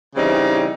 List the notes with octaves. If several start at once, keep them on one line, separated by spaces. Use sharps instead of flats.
C#3 E3 G3 C4 D#4